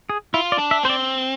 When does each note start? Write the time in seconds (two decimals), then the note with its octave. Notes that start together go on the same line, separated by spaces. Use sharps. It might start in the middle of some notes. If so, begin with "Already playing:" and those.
0.10 G#4
0.34 E4 F4
0.52 D5
0.59 D4
0.71 E5
0.83 C4 C5
0.90 D5